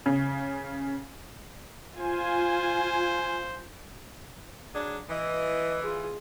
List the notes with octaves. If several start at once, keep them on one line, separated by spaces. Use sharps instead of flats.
C#3
F4 C5 G#5
F#3 D4 G#4
E3 D#5
F4 G#4